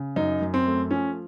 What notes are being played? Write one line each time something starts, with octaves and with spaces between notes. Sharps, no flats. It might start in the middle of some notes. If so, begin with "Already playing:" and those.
Already playing: C#3
F#2 D#4
F#2
C4
A3
F3 C#4